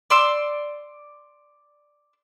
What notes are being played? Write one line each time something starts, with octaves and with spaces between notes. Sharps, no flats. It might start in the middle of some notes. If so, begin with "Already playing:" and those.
D5 C6 E6